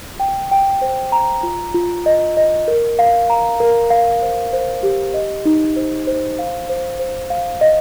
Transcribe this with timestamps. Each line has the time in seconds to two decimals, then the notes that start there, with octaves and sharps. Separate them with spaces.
0.20 G5
0.51 G5
0.82 C5
1.12 A#5
1.43 F4
1.74 F4
2.06 D#5
2.37 D#5
2.68 A#4
2.99 F5
3.30 A#5
3.60 A#4
3.90 F5
4.22 C5
4.53 C5
4.83 G4
5.14 D#5
5.45 D#4
5.76 C5
6.07 C5
6.39 F5
6.69 C5
6.99 C5
7.30 F5
7.61 D#5